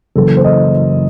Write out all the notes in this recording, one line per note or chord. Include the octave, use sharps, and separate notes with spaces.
F#1 F#2 E3 A4
C5
D#5